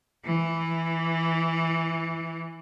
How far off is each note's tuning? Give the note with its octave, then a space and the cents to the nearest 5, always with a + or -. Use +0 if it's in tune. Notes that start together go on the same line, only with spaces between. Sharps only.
E3 +0